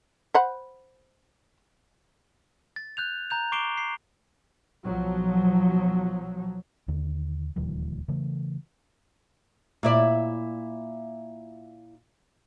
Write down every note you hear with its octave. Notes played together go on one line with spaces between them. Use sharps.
C5 F#5 B5
A6
F#6 G6 F7
A#5 G6 F7
C#6 D6 C7 D7 E7 G7
C7
B1 F3 F#3
D#2 D3
D#1 D2 E3 F#3
C#3 E3 A3
A#2 E4 D5